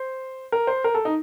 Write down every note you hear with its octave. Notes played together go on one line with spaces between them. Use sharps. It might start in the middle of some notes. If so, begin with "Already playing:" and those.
Already playing: C5
A#4
C5
A#4
A4
D#4